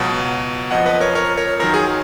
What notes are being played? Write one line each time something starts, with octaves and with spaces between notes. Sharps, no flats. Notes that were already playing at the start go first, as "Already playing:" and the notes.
Already playing: C#2 B2 F#3
F2 F3 D#5 F#5
B4 D#5
A#4 C#5
A#4 C#5
A#4 C#5
F#2 D#3 F#3 A#4
G#4